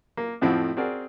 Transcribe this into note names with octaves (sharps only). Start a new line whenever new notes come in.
A#3
F2 A2 F3 C4 E4 F#4
C4 F#4 G#4 A#4 D5